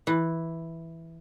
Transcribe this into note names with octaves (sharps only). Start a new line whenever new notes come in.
E3